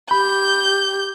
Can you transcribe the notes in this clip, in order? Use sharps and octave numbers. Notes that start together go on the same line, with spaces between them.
G4 B5 G6